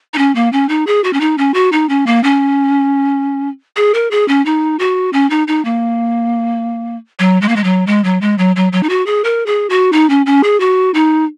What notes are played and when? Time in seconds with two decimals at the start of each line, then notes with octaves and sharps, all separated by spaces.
0.14 D#4
0.18 C#4
0.35 A#3
0.53 C#4
0.69 D#4
0.87 G#4
1.04 F#4
1.13 C#4
1.20 D#4
1.38 C#4
1.54 F#4
1.72 D#4
1.89 C#4
2.07 A#3
2.23 C#4
3.76 G#4
3.94 A#4
4.11 G#4
4.28 C#4
4.45 D#4
4.79 F#4
5.13 C#4
5.30 D#4
5.48 D#4
5.65 A#3
7.19 F#3
7.42 G#3
7.48 A#3
7.56 G#3
7.64 F#3
7.87 G#3
8.04 F#3
8.21 G#3
8.38 F#3
8.56 F#3
8.72 F#3
8.83 D#4
8.89 F#4
9.06 G#4
9.24 A#4
9.46 G#4
9.70 F#4
9.92 D#4
10.10 C#4
10.26 C#4
10.43 G#4
10.60 F#4
10.94 D#4